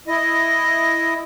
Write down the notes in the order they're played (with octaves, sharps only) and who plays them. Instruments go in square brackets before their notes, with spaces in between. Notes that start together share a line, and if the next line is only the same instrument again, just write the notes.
[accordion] E4 D#5